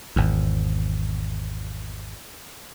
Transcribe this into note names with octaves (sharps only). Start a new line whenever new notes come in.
G#1 E2